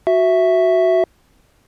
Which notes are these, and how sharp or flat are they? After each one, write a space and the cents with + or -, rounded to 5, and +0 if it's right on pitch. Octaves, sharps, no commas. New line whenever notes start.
F#4 +0 E5 +0